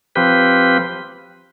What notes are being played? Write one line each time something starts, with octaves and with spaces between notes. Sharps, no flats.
F3 C4 G4 B4